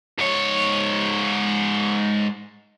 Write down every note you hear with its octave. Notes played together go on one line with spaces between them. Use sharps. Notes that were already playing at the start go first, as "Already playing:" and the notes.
G#2 C#5